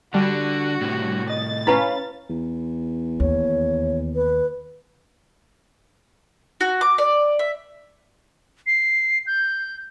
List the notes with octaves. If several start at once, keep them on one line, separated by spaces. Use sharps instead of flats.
D3 G3 D4 F#4
A2 C3
D#5 A6
C#4 E4 B4 F5 A5 B5
E2
D#2 C#5
B4
F#4
D6
D5
E5
C7
G6